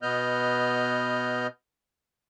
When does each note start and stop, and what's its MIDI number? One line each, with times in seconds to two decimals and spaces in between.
0.02 1.47 47
0.02 1.47 59
0.02 1.47 75
0.02 1.47 89
0.02 1.47 91